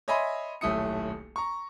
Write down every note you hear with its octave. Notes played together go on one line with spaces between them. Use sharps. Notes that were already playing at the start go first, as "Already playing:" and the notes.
C#5 D#5 E5 G#5 B5 C6
D#1 B1 A3 E4 D#6 C#7
A#5 C#6